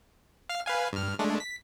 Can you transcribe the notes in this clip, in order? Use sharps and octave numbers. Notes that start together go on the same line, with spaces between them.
F5 F6
B4 F5 G#5
G2 F6
G#3 A3 D4
B6